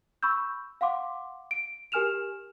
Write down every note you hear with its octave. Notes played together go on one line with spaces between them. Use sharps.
B5 C#6 E6 G6
F5 F#5 C6 D6
D7
G4 A#4 G#5 F6 E7 F7